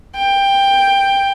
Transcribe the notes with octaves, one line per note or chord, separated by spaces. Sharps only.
G5